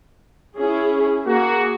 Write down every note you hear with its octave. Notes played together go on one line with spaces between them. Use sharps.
C#4 E4 G#4
A#3 F#4 G#4